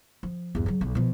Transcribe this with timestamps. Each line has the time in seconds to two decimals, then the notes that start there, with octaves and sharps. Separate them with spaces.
0.23 F3
0.55 E2 G2
0.66 C#3 F#3
0.81 B1
0.95 B2 F3